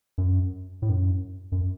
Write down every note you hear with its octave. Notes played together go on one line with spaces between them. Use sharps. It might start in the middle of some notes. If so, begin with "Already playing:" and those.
F#2
A2
F#2
F#2